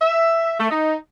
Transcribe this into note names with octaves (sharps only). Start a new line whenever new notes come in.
E5
A3
D#4